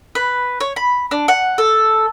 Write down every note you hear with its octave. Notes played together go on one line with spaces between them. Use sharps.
B4
C#5
B5
D4
F#5
A4